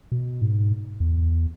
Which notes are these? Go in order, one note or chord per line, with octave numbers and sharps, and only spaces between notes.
B2
G#2
E2